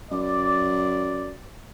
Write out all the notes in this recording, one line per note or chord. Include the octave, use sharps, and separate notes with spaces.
F#2 D5